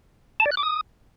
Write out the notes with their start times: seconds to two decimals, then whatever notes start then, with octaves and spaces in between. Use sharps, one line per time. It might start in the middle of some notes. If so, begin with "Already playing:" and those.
0.40 A5
0.46 D5
0.51 F#6
0.57 D6
0.63 D#6